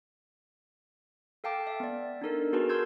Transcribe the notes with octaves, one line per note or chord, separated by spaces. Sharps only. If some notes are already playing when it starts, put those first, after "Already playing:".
A4 F5 G5 A5 D6
E5
B3 D5
D4 D#4 A4 A#4
B3 F#4 G#4 A#4 B4 A5
C6 E6 G6 G#6